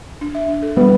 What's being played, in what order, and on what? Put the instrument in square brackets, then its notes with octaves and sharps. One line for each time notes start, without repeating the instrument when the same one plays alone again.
[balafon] D4
E5
D4
A4
[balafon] G3 [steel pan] B3